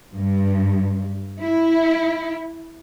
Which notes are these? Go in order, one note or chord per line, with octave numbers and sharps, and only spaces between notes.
G2
E4